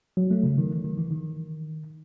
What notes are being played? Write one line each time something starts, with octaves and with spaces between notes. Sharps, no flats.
F#3
A3
C#3
D#3
E3
D#3
E3
D#3